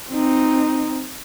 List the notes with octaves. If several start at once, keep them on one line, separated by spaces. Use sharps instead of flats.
C4 D#4